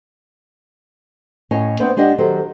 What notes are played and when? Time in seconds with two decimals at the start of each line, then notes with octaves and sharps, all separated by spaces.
1.51 A2 C#4 E4 C#5 D#5 G#5
1.80 A3 B3 C4 D4 B4 C5
1.97 G#3 D4 G4 D#5 F#5
2.18 D#3 F#3 G4 A4 C5